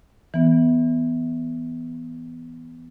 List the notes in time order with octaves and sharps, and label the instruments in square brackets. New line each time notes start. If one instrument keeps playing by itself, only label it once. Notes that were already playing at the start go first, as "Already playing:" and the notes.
[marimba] E3 B3